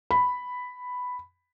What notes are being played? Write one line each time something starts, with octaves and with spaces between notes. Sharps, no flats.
B5